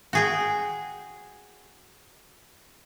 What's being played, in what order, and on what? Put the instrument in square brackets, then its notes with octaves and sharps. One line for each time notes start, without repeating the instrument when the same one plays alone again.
[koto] F#4 G#4 G5